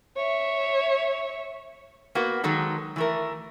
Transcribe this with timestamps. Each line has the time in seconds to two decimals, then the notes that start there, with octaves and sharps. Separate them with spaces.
0.16 C#5 E5
2.15 A#3 B3 F#4
2.44 D#3 F#3 G#3 A4
2.96 E3 A3 A#4